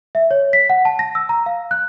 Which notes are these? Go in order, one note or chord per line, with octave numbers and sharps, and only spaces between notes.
E5
C#5
B6
F#5
A5
A#6
E6
A#5
F5
F#6